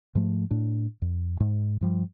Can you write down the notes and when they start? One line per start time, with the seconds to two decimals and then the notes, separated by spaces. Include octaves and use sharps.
0.15 G#2 F3 A3
0.51 A2 D4
1.02 F2
1.40 G#2
1.81 G2 F3 G3